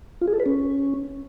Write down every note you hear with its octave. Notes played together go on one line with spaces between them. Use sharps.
F4
G#4
A4
B4
C#4